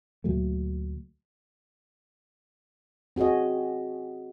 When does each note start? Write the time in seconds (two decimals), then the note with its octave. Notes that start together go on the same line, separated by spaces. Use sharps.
0.24 D2 A#2 F#3 A3
3.16 C4 F#4 G#4 C#5 D#5